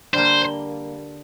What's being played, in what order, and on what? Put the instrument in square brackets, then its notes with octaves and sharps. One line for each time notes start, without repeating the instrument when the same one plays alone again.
[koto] D3 G3 A#3 [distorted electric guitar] C5